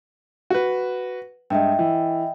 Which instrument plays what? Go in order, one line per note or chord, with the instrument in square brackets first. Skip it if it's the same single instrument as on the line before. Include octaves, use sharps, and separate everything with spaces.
[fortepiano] F#4 B4
[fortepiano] G2 G#3 [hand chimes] D#5 E5 G5
[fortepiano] E3